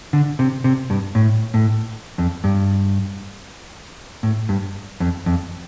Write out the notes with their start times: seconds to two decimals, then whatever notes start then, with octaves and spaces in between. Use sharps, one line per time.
0.13 D3
0.39 C3
0.64 C3
0.90 G2
1.15 A2
1.54 A2
2.18 F2
2.44 G2
4.23 A2
4.49 G2
5.00 F2
5.26 F2